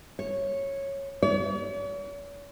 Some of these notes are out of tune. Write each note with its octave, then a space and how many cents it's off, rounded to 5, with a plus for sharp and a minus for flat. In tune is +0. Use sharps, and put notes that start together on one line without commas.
C#5 -10
C#5 +45